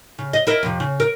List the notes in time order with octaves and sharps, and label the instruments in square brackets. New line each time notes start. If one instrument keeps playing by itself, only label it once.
[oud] C#3
D#5
E4 A#4 D#5
F2 C3
C#3
A#4